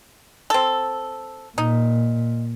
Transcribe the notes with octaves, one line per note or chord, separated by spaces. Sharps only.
C4 A4
A#2 D#4